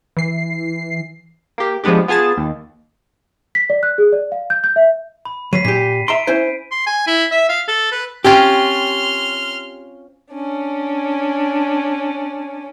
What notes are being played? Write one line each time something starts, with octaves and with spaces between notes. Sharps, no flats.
E3 C7
A#3 G4
F3 G#3 B3 D4 G4
B3 F4 G#4 A5 A6
D#2
B6
D5
F#6
G#4
D5
F5
G6
G6
E5
B5
F#3 B6 C7 D#7
A#2 G4 B6
E5 A#5 C6 D7
C#4 E4 C5
C6
G#5
E4
E5
F5
A4
B4
C4 C#4 F4 G4 C6 F6
C#4 D4